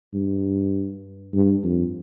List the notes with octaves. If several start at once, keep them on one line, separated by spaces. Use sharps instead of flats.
G2
G2
F2